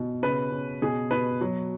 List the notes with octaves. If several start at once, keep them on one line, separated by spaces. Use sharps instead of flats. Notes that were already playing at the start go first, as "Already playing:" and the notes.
Already playing: B2
C#3 B4
C#3
B2 G#4
B2 B4
F#3